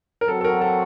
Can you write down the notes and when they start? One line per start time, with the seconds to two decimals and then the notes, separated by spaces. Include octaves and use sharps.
0.21 A#4
0.28 F#3 C4 F#4 A4
0.41 A4
0.45 A#4
0.61 A4